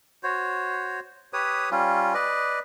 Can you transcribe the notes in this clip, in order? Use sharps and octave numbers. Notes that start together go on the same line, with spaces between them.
F#4 C5 C#5
G4 B4 C#5 D#6
G3 C#4 F4
B4 D5 D#5